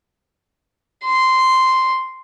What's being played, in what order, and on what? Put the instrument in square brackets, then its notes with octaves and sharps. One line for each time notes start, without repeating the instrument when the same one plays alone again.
[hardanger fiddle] C6